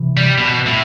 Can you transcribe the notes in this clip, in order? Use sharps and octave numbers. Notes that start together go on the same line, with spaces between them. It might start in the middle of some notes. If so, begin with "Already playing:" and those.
Already playing: C3 E3
G3
B2
A2